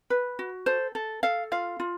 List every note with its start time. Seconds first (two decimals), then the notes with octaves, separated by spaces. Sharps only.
0.10 B4
0.39 F#4
0.66 A4 C5
0.95 A4
1.23 A4 F5
1.52 F4 F5
1.80 F4